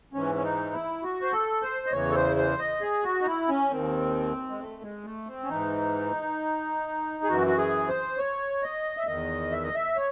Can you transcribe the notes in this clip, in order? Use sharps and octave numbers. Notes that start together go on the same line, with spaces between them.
G#2 E3 C#4
C#4
D#4
E4
F#4
C5
A4
C5
D#5
E2 C#3 E3 C#5
A4
C5
C5
D#5
G#4
F#4
D#4
E4
C#4
D#2 D#3 C4
G#3
A3
G#3
A3
C4
C#4
G#2 E3 D#4
G#4
F#2 E3 F#4
F#4
G#4
C5
C#5
D#5
E5
E2 D#3 D#5
E5
D#5
E5
C#5